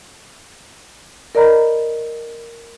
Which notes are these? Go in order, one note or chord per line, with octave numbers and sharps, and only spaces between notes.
A#4 D5 D#5 A#5 B5